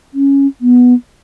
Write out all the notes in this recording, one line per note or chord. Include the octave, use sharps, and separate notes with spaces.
C#4
B3